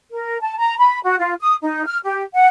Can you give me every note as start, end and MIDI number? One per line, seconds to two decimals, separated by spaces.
0.12 0.38 70
0.41 0.57 81
0.57 0.77 82
0.78 0.99 83
1.03 1.15 66
1.19 1.33 65
1.40 1.55 87
1.62 1.83 63
1.86 1.98 89
2.03 2.23 67
2.34 2.48 78